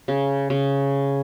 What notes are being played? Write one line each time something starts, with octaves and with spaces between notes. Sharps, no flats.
C#3
C#3